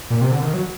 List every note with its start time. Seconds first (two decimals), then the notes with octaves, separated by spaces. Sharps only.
0.10 A#2
0.21 C3
0.31 D3
0.42 D#3
0.54 F#3